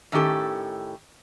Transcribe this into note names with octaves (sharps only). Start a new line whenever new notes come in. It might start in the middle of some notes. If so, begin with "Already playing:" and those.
A2 D#3 C#4 G4 A4